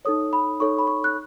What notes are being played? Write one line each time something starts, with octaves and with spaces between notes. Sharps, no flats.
D#4 A4 C#5 D#6
B5
D#4 A4 C#5 C#6
B5
C#6
F#6